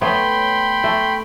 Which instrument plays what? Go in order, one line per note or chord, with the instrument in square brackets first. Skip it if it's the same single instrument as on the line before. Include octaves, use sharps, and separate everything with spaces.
[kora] A3 B3 C#5 [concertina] G5 B5 C6
[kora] A3